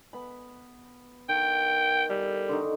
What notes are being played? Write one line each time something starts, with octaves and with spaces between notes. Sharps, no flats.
B3 B5
D#3 G5
G3 A4
D3 D#3 D#4